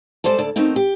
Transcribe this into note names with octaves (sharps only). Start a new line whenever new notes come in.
G3 G#3 A4 C5 D5 A5
D2 A4 D5
B2 D#3 A3 C4 D#4
G4